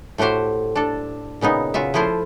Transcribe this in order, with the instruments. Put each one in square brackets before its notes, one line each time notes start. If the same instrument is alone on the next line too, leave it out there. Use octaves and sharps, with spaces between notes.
[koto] A2 A3 F#4 G4 C5
D4 A4
A#2 C#3 B3 D#4
C#3 F4 F#4 E5
F3 A3 E4 F4 C5